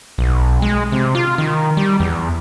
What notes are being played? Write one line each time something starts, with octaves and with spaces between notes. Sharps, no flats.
B1
G#3
C3
F4
D#3
G3
E2